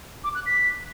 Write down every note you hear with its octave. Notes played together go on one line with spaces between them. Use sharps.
D6
F#6
B6